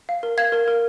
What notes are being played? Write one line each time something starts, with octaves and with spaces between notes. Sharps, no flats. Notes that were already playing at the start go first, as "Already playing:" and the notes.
F5
A#4
F5 G#6
A#4
A#4